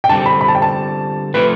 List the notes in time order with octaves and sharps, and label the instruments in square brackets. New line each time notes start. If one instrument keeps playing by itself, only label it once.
[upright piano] G5
[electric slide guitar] D3 G3 C4 [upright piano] A5
[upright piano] B5
B5
A5
G5
A5
[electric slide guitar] F3 A3 C4 [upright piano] B4